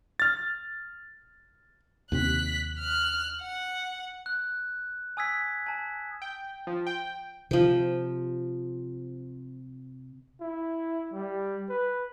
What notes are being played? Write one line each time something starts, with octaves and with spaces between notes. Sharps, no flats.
F6 A6
D#2 C3 C4 F#6 B6
F6 F#6
F#5
F#6
G#5 D#6 E6 G#6 B6
G#5 A5
G5
F3
G5
C3 F3 G5
E4
G3
B4